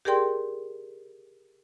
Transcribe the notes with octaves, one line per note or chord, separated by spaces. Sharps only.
G4 G#4 A#4 D5 G5 C6